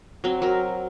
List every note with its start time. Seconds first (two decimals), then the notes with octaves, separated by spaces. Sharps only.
0.24 F#3 C4
0.42 F#3 A#4